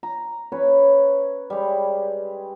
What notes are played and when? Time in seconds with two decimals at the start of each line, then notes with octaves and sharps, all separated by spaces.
0.03 A#5
0.52 C#4 B4 C#5
1.50 G3 G#3